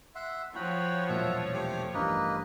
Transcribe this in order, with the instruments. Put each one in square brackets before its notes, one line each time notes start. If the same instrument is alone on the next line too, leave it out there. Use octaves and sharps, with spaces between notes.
[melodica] E5 F#5 C6
[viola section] F3 C#5 [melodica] F#4 G5 B5
[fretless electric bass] E1 A#2 F#3 [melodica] E5 F#5 A5
[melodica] A3 G4 D6
[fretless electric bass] A1 G2 [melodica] A#3 B4 D#5